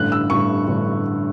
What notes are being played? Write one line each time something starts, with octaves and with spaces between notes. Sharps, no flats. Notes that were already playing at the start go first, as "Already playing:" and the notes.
Already playing: A1 G2 D3 F#6
E6
A1 G2 D3 C#6
A1 G2 D3